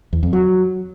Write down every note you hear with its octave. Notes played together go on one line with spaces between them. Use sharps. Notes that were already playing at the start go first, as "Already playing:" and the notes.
E2
F2
F#3